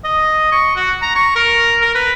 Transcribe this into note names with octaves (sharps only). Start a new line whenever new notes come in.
D#5
C#6
F#4
A#5
C#6
A#4
A#4
B4